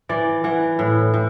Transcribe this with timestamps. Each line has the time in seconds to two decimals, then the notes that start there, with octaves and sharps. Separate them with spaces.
0.09 E3 D5
0.44 E3 F#5
0.79 A2
1.14 A2